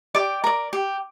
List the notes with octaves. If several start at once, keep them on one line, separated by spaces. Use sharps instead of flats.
G4 D5 D6
A#4 D5
G4